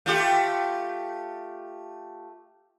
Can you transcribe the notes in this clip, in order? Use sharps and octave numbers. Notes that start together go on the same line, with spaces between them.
A3 F4 G4